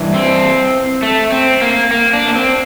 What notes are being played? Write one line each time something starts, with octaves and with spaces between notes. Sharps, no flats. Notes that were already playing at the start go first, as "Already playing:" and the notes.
Already playing: G2 E3
C4
A3
C4
A#3
A#3
D4
A#3
C4